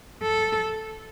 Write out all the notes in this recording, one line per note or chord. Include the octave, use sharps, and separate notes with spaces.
A4